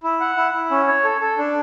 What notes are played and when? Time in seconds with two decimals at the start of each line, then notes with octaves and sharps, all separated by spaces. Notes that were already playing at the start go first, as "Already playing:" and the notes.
0.03 E4
0.20 F#5
0.37 E4
0.54 E4
0.71 C#4
0.87 C#5
1.04 A4
1.21 A4
1.38 D4